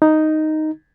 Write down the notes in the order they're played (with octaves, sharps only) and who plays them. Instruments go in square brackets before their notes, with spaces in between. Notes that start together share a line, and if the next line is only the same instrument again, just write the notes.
[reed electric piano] D#4